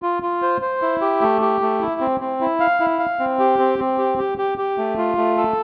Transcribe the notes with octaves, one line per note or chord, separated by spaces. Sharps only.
F4
F4
C5
C5
E4
G4
A3
G4
A3
E4
C4
C4
E4
F5
E4
F5
C4
G4
C4
C4
G4
G4
G4
G4
A3
F4
A3
A4